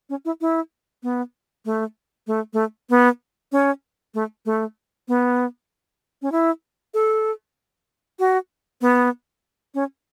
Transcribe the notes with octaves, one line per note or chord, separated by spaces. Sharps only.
C#4
E4
E4
B3
A3
A3
A3
B3
C#4
A3
A3
B3
C#4
E4
A4
F#4
B3
C#4